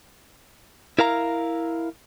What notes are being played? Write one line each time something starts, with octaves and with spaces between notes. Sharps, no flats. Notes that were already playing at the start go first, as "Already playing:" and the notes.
E4 A#4 F5 A#5